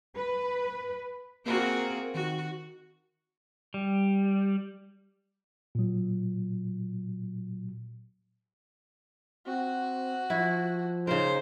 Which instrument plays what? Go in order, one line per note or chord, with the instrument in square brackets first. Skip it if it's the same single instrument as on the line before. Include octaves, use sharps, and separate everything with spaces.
[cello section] B4
[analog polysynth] A#3 A#4 [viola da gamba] C4 F#4 G#4
[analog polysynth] D#3 [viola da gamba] F#4
[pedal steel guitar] G3
[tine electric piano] A#2 F#3
[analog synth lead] C4 [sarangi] F#4
[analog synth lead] F3 [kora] E4
[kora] C#3 A#4 [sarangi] D#4 [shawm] C5